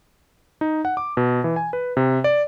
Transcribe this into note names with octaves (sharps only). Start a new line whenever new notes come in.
D#4
F#5
D6
B2
E3
G#5
B4
C3
D5